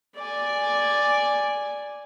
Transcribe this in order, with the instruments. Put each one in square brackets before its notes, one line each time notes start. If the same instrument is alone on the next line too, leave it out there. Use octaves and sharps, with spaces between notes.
[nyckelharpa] D5 G#5